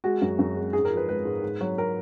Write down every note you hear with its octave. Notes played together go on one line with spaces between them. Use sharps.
G#3 F#4
F#2
F#2
G#3
G#2 G#4
A#4
F3
B4
G#3 B4
G#2
G#2
F#3
A#4